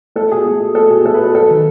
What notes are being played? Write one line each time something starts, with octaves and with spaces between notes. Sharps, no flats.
A3 A4
B2 G#4
A3
B2
A3 A4
B2 G#4
A3 A4
B4
B2 A4
F#3 A4
D#3